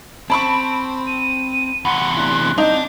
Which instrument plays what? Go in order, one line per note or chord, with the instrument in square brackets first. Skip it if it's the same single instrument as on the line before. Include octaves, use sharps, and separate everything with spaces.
[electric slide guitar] C4 [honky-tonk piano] A5 B5 C#6 [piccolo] D7
[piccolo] D#7
[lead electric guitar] E2 C3 [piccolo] F#5
[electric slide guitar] A3 D4 E4 [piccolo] F#6
[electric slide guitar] G3 C4 [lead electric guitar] D4 [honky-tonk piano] D#4 [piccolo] G6